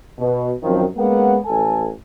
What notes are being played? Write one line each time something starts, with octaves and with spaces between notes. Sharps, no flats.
B2
F#2 D#3 F3 F#3 C4
G#3 A#3 B3 C#4 F#5
A1 A4 G#5